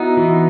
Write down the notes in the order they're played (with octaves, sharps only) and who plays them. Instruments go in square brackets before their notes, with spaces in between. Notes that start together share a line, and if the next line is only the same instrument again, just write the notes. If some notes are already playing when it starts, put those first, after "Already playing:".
Already playing: [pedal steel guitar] B3 D#4 [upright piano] E4 F#4
[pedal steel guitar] E3 [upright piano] F#4